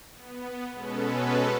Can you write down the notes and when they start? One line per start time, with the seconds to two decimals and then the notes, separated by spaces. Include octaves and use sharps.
0.14 B3
0.73 B2 G#3 B3 C#4 A4 B4